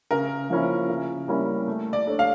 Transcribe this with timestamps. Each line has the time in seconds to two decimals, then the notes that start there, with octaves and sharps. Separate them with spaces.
0.11 C#3 A#4
0.50 F3 A#3 C#4 E4
0.89 C#3
1.28 G3 A#3 C#4 E4
1.68 A3
1.93 D5
2.07 D4 A4 C#5
2.19 F5